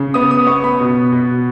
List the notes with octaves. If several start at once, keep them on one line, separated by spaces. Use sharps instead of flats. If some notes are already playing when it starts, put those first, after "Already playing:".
Already playing: C#3
B3 D#6
D#6
B3 C#6
B5
B2
B2